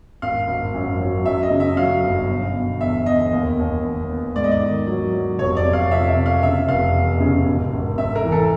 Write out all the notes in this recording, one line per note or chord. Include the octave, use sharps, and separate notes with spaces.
G#1 F5
G#1
F#2
F#3
F#2 E5
D#5
C#3
E5
F#3 F5
G1
B2
B2
E2 E5
E2 D#5
D#2
D#2
D#2
B3
G#2 D5
D#5
D5
D#3
F#3
F#3
F1 C#5
D5
C3
F5
F2 E5
E5
C3
F5
C#3 E5
F1 F5
E2
C#3
G#1
G#1
G#1 E5
A#4
E3
A4